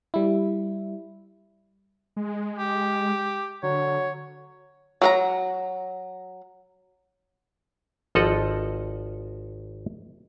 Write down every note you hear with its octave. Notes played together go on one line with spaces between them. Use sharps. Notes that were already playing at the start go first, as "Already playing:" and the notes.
G3 E4
G#3
G4
D3 F#3 C#5
F#3 A#4 A#5
G#1 F3 A4 D#5 F#5